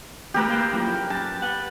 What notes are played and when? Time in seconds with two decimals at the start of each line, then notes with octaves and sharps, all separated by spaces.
0.34 E2 A3 G4 A#4 B4
0.49 A#3 F5 G5
0.73 F#2 F3 E4
1.10 F#2 A5
1.42 B4 F#5